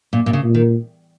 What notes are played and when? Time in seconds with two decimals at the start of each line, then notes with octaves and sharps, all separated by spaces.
0.13 A#2
0.26 A#2
0.33 C#3
0.44 A#2
0.55 D#3